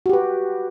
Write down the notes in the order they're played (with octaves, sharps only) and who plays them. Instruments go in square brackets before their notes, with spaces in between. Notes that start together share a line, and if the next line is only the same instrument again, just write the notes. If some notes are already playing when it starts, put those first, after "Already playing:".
[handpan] F#4
G4
B4